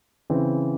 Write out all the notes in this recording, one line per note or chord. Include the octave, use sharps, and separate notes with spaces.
C#3 E3 C4